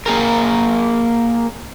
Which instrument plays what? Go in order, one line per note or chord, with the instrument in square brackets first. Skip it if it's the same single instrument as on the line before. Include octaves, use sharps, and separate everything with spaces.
[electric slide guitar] A#3 G#4 A#4